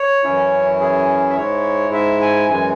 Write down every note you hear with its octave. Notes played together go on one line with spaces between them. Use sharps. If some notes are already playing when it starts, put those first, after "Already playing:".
Already playing: C#5
F#2 E3 C#4 E4
G#4
E5
G#2 G#3 E4 C#5
E5
G#5
F#2 E3 G#3 G#5